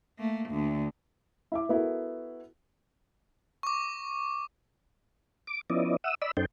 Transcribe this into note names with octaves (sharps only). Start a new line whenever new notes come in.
A3 A#3
D2 D3
E4 E5 D6
B3 E4 F#4 A4 A#4
C#6 D6
D6
F3 B3 C#4 E4 D5 D#5
E5 F#5 D#6 E6
D5 D#5 B5 E6
F#2 C#4 D#4 A4 C5 G5